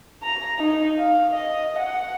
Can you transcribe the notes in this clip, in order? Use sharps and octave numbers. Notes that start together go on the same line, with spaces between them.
A#5
D#4
F5
D#5
F#5